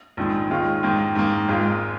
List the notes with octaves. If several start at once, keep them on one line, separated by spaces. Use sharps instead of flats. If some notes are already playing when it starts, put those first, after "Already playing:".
A#1 G#2 D#3
D#2 D#3 G#3 F4
G#2 D#3 A#3
G#2 D#3 A#3
G#1 G#2 G#3 F4